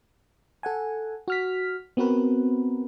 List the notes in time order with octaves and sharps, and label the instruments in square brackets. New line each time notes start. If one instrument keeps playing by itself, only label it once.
[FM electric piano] A4 F#5 G#5
F#4 F6 B6
B3 C4 F#4 A#4 B4